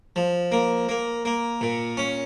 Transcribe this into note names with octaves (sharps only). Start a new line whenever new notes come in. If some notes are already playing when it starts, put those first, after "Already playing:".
F3
A#3
A#3
A#3
A#2
C#4